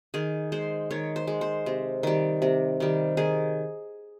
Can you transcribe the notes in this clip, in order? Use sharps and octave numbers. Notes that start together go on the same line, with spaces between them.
D#3 G#4
G#3 C5
D#3 C#5
C5
G#3
C5
C3
D#3 G3
C3
D#3 G3
D#3 G#4